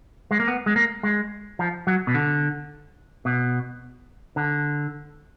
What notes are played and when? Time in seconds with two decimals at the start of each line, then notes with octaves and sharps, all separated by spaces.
0.31 G#3
0.40 A#3
0.48 B3
0.66 G#3
0.76 A#3
1.03 G#3
1.59 F3
1.87 F#3
2.07 B2
2.14 D3
3.25 B2
4.36 D3